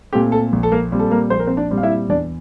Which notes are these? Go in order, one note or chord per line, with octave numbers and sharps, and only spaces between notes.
A#2 A3 C4 G4
A4
A#1
A4
A#3 A#4
A#2 G3 C4
A4
A#3 A#4
A#1 C5
A#4
C4 C5
D4 D5
A#2 G3 C4
F5
E4 E5
E2 D4 D5